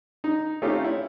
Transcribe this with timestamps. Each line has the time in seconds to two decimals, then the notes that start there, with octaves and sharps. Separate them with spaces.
0.24 D#4
0.62 A3 C4 C#4 D#4 F4 G4
0.84 E4